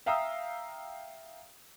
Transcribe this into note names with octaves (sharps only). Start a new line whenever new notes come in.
E5 F5 G5 A#5 D#6 E6